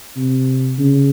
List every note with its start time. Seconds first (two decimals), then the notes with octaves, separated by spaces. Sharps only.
0.17 C3
0.79 C#3